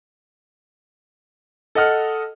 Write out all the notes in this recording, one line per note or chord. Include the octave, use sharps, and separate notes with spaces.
A4 D#5 F#5 F6